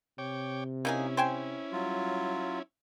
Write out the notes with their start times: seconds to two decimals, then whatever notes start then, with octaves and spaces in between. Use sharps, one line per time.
0.18 C3 C#5 G5 D6
0.85 A#3 C#4 D#4 E4 G#4
1.17 C5 G5 G#5
1.72 F#3 G3 F4